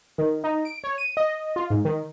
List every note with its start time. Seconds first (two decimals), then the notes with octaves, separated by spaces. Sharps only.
0.18 D#3
0.44 D#4
0.65 D7
0.84 C#5
0.98 D#7
1.17 D#5
1.56 F4
1.70 G#2
1.85 D#3